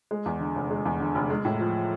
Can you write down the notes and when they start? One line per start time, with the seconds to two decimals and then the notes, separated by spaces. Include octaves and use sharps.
0.11 G#3
0.26 E2
0.40 D3
0.55 F1
0.71 G#3
0.85 E2
1.00 D3
1.15 F1
1.30 G#3
1.45 A2
1.59 F3